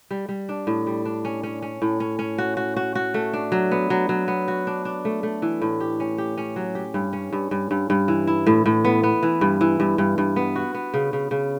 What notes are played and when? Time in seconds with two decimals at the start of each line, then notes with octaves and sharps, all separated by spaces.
0.11 G3
0.29 G3
0.49 D4
0.67 A2
0.87 G3
1.05 D4
1.25 C#4
1.43 C#4
1.62 C#4
1.82 A2
2.00 C#4
2.19 C#4
2.38 F#4
2.57 F#4
2.76 F#4
2.95 F#4
3.14 A3
3.33 D4
3.52 F#3
3.71 B3
3.90 F#3
4.09 F#3
4.28 B3
4.48 F#4
4.67 D4
4.85 D4
5.05 A3
5.23 A3
5.42 E3
5.61 A2
5.80 G4
6.00 C#4
6.18 G4
6.38 C#4
6.56 F#3
6.75 G4
6.94 G2
7.13 C#4
7.33 G2
7.51 G2
7.71 G2
7.90 G2
8.08 E3
8.27 E4
8.47 A2
8.66 A2
8.85 B3
9.03 B3
9.23 E3
9.41 G2
9.61 E3
9.80 G2
9.98 G2
10.18 G2
10.36 B3
10.56 F#4
10.74 B3
10.94 C#3
11.13 C#3
11.31 C#3